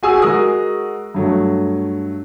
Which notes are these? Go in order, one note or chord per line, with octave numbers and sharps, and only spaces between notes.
F#4 G#4 G#5 D#6 E6
G#3 F#4 A#4 D#6
G2 F#3 A3